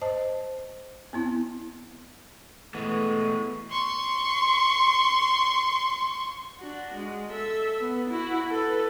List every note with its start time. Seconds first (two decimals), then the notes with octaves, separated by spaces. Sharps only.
0.01 C5 D#5 A5
1.13 B3 C4 E4
2.74 E3 G#3 A3 B3 C#6
3.71 C6 C#6
6.59 D4 F#4
6.95 G#3
7.29 A4 E5
7.80 B3
8.10 E4 F#4
8.51 A4 B4